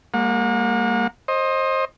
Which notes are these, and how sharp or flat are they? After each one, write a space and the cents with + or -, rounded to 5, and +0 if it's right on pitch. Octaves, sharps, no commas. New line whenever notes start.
G3 +45 A#3 -10 F#5 -45
C5 +25 D#5 +0